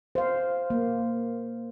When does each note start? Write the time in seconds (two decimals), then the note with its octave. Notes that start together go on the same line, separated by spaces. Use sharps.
0.15 C5 F5
0.70 A#3